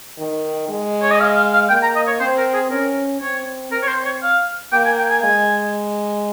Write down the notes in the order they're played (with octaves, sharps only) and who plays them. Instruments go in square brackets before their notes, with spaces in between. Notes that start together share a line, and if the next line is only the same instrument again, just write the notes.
[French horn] D#3
G#3
[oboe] C#5
D#5
F5
F5
F5
[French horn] A#3 [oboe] G5
[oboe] A#5
D#5
C#5
[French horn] C4 [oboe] C5
[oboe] A#4
G#4
[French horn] C#4 [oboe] A#4
[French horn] C4 [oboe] C#5
[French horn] C4 [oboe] A#4
[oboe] C#5
C5
C#5
F5
[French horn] A#3 [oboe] G5
[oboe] G#5
G5
G#5
[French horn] G#3 [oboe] G#5